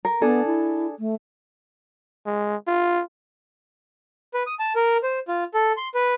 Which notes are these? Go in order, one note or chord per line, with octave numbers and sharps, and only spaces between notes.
A#4
B3 D4 G#4 A4
E4
A3
G#3
F4
B4
D#6
A5
A#4
C5
F4
A4
C6
B4